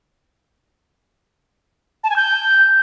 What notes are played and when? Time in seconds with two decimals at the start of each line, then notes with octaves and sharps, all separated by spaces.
2.04 A5
2.10 G#5
2.16 G6